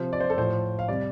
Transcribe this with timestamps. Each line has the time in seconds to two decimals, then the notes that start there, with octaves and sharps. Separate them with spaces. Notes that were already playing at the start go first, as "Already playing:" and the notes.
Already playing: C3 F3 C5
0.13 D5
0.20 C5
0.30 A4
0.37 A2 F3 C5
0.79 F5
0.88 C3 G3 D5